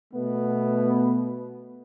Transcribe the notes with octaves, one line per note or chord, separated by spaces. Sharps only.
B2 A3 B3